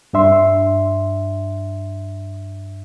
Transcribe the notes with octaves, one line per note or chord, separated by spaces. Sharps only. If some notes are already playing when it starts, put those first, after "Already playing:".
G2 D4 E5 C6